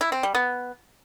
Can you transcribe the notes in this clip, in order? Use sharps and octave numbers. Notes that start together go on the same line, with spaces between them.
E4
C4
G3
B3